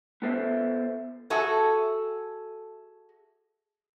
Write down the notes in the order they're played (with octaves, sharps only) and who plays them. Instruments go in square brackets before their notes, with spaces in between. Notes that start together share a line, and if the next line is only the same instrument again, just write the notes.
[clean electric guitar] B3 F4 A4 C5 E5
[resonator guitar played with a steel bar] F#4 G#4 A4 E5